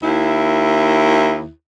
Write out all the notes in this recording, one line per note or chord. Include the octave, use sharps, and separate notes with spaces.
D#2 E4